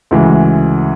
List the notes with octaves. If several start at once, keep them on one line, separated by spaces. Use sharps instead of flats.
D2 C#3 E3 G#3